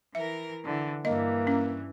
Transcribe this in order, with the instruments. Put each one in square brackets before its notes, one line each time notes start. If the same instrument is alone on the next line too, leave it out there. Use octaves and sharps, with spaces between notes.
[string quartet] E3 A#4 A#6 [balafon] E5
[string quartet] D3 E3
[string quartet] G2 E3 [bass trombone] A#3 [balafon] D#5
[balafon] C#4